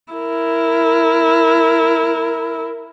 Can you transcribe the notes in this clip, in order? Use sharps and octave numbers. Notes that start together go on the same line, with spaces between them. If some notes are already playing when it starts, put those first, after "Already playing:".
E4 A#4